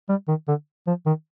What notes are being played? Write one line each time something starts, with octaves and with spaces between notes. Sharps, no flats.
G3
D#3
D3
F3
D#3